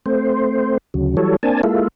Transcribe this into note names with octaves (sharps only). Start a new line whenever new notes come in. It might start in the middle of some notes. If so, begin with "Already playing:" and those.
A3 C4 C5
D2 C#3 F#3
E3 F#3 G3 A4 C#5
A#3 C4 D4 G#5 A5
G#3 A#3 E4 F4 A4